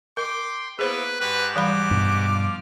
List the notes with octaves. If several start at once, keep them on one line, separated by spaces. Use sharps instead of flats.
A#4 G5 C6 D6
A#3 B3 E4 G#4 B4 C5 B5
G#2 F#4 G4 B4
E3 G3 B5 D6
G2 B2
F3 F6